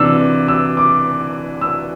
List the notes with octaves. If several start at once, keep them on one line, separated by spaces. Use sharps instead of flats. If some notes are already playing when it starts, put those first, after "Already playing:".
Already playing: C3 E3 D4 E6
E6
D6
E6